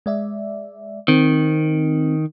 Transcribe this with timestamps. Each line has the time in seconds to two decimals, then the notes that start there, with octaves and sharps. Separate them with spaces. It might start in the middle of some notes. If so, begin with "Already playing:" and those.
0.06 G#3 D5 E5
1.08 D#3 C4